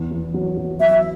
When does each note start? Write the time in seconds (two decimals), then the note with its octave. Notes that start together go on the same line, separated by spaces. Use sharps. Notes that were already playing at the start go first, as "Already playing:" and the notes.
Already playing: E2
0.11 E2
0.34 F#3
0.57 F#3
0.80 F#3 E5